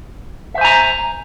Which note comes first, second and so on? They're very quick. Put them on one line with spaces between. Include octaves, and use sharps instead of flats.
E5 C5 G#5 A#5